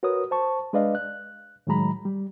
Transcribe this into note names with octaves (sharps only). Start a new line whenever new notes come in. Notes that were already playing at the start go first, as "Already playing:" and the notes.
F#4 A#4 B4 C#5 D#6
C5 A5 C#6
G#3 D4 B4 D5 D#5 F5
F#6
A2 D#3 F#3 G#3 A#5 B5
G3